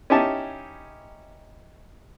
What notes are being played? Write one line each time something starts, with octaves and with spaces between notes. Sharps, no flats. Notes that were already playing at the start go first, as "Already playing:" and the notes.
C#4 D#4 E4 G4 G#5 A5